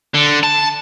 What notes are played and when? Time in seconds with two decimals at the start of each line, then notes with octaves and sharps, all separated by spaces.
0.14 D3
0.44 A5